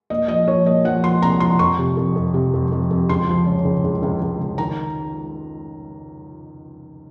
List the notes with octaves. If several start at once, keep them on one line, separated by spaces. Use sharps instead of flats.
A#2 D#5
F3 D#5
F3 C#5
A#2 D#5
F3 F#5
F3 C6
C2 A#5
F3 C6
F2 C#6
C3
F2
F2
C3
F2
F2
F2
C#2 C6
F3
C#3
C#2
C#2
C#2
C#2
C#2
D#3 A#5